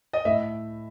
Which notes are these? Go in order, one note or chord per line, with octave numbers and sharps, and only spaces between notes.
D#5
A2 E5